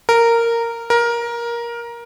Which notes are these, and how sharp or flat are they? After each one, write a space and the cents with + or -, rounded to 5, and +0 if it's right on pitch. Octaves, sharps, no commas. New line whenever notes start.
A#4 -10
A#4 +15